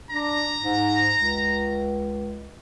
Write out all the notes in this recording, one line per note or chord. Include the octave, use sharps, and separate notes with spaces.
D4 A#5
G#2
C#2